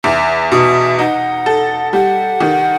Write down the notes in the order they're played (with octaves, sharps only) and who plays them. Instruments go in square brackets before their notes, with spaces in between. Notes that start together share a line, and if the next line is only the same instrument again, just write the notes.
[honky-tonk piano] E2 [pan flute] E5
[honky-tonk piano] B2
[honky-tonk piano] D#4 [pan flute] F#5
[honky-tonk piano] A4
[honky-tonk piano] G3 [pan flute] F#5
[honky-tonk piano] D#3